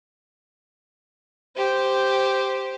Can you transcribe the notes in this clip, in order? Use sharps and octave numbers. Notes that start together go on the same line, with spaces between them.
G4 C5